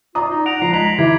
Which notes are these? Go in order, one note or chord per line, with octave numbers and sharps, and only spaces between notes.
F4 D5 A#5 D#6
D#4
F#5 A#6 D7 F7
F3 A#5 C7
G#3 A#5 B6 F7 F#7
E3 E4 G4 G#6